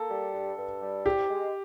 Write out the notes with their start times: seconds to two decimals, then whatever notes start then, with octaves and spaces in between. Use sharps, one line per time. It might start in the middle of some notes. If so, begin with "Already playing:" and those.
Already playing: A#3 A4
0.10 G3
0.33 G2
0.58 G2
0.82 G3
1.05 C2 G4
1.29 G#3